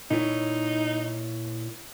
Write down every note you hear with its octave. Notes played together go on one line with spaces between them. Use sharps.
A#2 D#4 E4 C#5